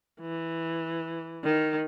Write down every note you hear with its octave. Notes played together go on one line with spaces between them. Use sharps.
E3
D#3